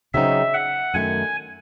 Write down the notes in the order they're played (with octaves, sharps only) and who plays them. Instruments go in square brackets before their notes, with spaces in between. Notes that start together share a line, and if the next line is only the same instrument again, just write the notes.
[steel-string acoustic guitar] C#3 F#3 C4 D#4 [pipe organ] E5
[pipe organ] F#5
[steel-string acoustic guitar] F#2 D#3 A3 [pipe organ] G#5